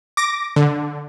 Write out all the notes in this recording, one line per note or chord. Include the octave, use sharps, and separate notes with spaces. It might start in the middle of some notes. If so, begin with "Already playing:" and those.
D6 A#6
D3